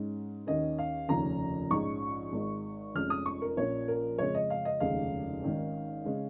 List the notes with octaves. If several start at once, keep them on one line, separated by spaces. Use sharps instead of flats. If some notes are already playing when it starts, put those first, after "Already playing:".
Already playing: G#2 G#3 C#4
D#2 D#3 C#4 D#5
F5
F1 D#2 C#3 F3 C#4 A#5
A#1 G#2 G#3 C#4 C#6
G#1 G#2 G#3
F1 F2 F3 G#3 C#4 F6
D#6
C#6
A#4
A#1 A#2 A#3 C#4 C#5
A#4
F2 C#3 G#3 C#4 C#5
D#5
F5
D#5
F1 D#2 C#3 G#3 F5
G#1 G#2 D#3 C#4
C#3 G#3 C#4